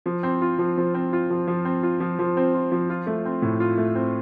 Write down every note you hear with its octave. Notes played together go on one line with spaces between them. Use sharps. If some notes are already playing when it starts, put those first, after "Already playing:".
F3
C4
F4
F3
F3
C4
F4
F3
F3
C4
F4
F3
F3
C4
F4
F3
F4
A3
C4
A2
F4
A3
C4